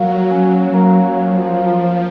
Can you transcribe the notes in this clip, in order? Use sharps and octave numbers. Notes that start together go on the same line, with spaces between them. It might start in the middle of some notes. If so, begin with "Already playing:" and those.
Already playing: F#3 A#3 F#4
C#4
A#3
F3 F5